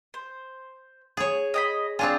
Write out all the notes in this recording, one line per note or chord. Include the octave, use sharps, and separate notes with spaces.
C5
G#4 C#5
D#5 G5 B5
C4 D4 F4 G#4 C#5 A5